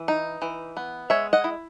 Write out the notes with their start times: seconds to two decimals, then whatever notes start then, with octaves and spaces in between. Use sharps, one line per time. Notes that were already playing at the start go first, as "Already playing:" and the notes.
Already playing: E3
0.08 D#4
0.42 E3
0.77 B3
1.10 G#3 C#5 E5
1.33 D#5 F#5
1.44 E4